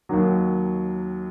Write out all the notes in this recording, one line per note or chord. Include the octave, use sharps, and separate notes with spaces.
D#2 D#3 F#3